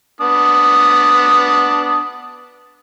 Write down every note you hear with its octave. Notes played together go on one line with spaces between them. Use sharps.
B3 D4 D#6